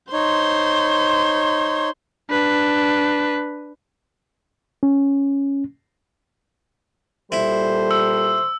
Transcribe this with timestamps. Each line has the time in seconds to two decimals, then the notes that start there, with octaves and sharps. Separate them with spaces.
0.13 D#4 C5 C#5 C6
2.30 D4 B4
4.83 C#4
7.32 A#2 G3 E4 A4 C5
7.91 E6